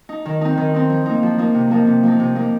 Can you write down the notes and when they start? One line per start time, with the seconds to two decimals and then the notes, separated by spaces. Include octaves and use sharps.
0.09 D#4
0.26 D#3
0.41 C4 D#4
0.58 D#3
0.74 C4 D#4
0.90 F3
1.06 A#3 D#4
1.23 F3
1.38 A#3 D#4
1.55 C3
1.71 F3 A#3 D#4
1.87 C3
2.03 F3 A#3 D#4
2.20 C3
2.35 F3 A#3 D#4